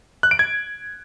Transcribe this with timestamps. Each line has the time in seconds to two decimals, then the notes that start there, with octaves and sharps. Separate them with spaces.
0.23 F#6
0.31 D7
0.39 G#6